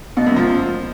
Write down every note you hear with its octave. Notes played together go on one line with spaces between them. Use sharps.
B2
F#2
F3